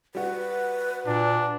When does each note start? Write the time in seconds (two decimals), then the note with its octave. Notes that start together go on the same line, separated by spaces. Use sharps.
0.15 G3 F#4 B4
1.07 A#2 D4